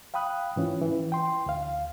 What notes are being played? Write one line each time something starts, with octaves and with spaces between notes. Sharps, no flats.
F5 G5 B5 D#6 F#6
G#2 E3 C#4 F4
E3
G5 C6
D2 F5